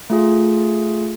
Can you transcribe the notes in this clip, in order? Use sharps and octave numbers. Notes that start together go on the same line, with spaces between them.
A3 F4 G#4